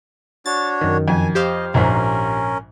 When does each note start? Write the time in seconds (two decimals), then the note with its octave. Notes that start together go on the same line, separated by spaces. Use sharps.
0.46 D4 F#4 C#5 A6
0.81 F#2 D#3
1.08 F2 G#5
1.35 G4 C5 D#5 F5
1.74 A#1 G#2 C#4 A#4